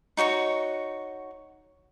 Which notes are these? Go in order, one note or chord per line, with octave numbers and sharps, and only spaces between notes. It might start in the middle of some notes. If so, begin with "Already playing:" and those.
D#4 F#4 C#5 C#6